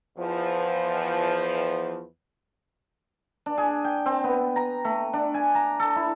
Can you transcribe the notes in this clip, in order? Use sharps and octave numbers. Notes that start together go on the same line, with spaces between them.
E2 F3
D4
G#4
G5
C4
B3
A#5
A3
D4
G#5
A#5
A4
E4